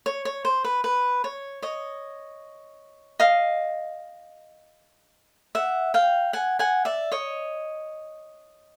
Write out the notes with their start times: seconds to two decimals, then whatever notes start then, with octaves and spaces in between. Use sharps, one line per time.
0.06 C#5
0.25 C#5
0.45 C5
0.64 B4
0.84 B4
1.24 C#5
1.62 C#5 D#5
3.20 D#5 F5
5.55 E5 F#5
5.94 F5 G5
6.33 F#5 G#5
6.59 F#5 G#5
6.85 D5 E5
7.12 C#5 D#5